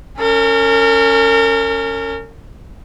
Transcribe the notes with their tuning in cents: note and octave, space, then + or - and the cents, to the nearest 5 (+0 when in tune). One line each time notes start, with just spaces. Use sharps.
C#4 +0 A#4 -40